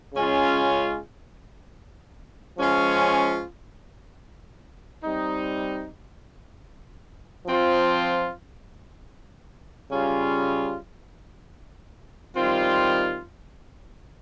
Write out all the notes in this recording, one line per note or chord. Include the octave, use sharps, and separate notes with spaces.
C#3 G#3 C#4 F4
F3 G#3 C#4 F4
G3 C4 D#4
F3 C4 F4
C#3 G3 C#4 F4
D#3 G3 C4 F4